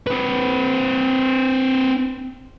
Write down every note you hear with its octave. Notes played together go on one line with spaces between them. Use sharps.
C4 B4